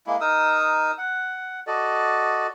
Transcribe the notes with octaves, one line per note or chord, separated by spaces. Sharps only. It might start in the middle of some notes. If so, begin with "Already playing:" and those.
G#3 A#3 E4
D#4 A#4 D#6 E6
F#5
F#4 A4 D5 D#5